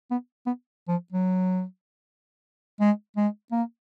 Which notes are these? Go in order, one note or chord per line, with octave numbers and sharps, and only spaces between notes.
B3
B3
F3
F#3
G#3
G#3
A#3